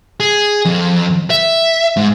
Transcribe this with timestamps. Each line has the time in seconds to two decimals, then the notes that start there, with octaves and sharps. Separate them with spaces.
0.20 G#4
0.65 F2
1.30 E5
1.97 G#2